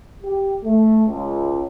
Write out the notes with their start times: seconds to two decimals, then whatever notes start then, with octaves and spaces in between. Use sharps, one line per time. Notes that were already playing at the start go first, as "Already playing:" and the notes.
0.24 G4
0.64 A3
1.07 C#2